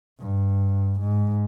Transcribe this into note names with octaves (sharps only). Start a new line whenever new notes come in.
G2
G#2